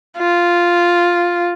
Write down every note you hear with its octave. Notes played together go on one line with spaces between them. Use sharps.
F4